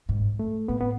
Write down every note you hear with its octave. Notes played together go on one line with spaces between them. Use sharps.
G#2
A3
A2 B3
B3